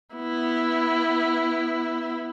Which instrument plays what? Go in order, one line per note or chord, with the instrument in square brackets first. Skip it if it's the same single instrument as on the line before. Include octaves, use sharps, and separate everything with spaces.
[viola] B3 E4